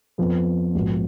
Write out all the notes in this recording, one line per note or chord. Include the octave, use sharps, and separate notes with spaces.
F2 F3 B3
A#1 G#2 F3 B3 F#4